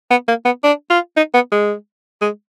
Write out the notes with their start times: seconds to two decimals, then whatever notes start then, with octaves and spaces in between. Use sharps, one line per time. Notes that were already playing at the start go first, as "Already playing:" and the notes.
0.11 B3
0.28 A#3
0.45 B3
0.64 D4
0.90 F4
1.17 D#4
1.34 B3
1.52 G#3
2.21 G#3